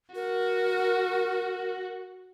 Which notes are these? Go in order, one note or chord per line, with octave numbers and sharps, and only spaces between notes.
F#4 A#4